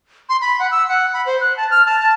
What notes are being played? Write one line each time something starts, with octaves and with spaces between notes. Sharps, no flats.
C6
B5
F#5
E6
F#5
B5
C5
F#6
A5
F6
A5
A5